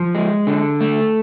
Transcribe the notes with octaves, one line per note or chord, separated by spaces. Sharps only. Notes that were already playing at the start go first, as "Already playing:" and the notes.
Already playing: F3
G#3
D3
A3